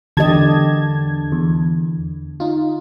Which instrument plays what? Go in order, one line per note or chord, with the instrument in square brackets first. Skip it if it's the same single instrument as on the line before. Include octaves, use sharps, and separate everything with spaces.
[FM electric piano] E2 A5 G#6 [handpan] D3 G4 D#5
[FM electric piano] E2
D#4 F4